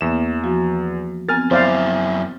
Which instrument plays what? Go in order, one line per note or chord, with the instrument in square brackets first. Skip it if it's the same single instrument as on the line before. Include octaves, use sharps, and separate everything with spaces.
[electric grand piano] E2 E7 [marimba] E3 A#3 B3
[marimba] F3 F#4
[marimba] B3 C4 [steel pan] A#4 [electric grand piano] G#5 F6 A6
[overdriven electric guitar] F#2 E4 [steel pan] C5 D5 F5